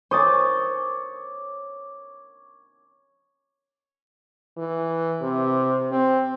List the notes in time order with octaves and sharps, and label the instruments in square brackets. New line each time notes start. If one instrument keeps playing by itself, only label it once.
[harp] C5 D#6 A6 [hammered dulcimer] C#5 D6
[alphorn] E3
C3
C4